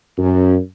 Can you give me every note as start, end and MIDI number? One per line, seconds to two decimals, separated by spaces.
0.18 0.58 42